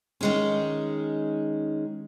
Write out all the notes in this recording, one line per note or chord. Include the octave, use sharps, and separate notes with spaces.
D#3 G#3 C#4